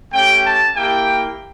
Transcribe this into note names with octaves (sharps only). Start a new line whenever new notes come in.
A3 C#4 G4 G5
A5
A#3 E4 G4 G5